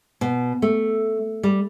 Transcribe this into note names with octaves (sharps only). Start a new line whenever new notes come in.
B2
A3
G3